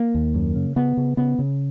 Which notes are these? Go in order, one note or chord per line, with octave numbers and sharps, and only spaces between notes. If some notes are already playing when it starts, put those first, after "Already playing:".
Already playing: A#3
D#2
F#2
C#3
C#3 B3
C#3
C#3 B3
C#3